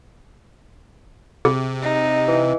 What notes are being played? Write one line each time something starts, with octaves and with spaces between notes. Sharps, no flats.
C3 G#4
D#4
E3